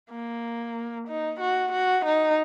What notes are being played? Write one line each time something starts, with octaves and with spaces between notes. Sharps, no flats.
A#3
D#4
F#4
F#4
D#4